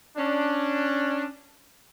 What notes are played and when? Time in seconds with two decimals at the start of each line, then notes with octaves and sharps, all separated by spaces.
0.18 C#4 D4